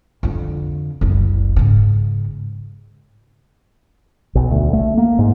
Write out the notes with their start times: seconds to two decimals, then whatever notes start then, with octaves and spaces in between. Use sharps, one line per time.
0.23 F2 D3
1.01 F#1 C2
1.56 G#2 C#3
4.35 B1
4.51 D2
4.73 A3
4.97 A#3
5.19 G#2